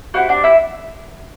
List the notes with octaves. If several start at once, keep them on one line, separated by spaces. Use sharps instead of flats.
C4 E4 F#4 G4 F#5
D4 D5
E4 E5